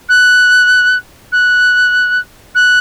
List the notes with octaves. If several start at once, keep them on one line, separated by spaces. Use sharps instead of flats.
F#6
F#6
F#6